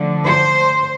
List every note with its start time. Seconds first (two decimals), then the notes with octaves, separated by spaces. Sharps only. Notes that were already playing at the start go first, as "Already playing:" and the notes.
Already playing: D3 F3 A3
0.24 C5